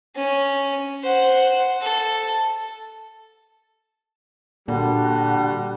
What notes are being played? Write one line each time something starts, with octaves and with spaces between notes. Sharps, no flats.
C#4
C5 F#5
A4
A#2 D3 G3 F#4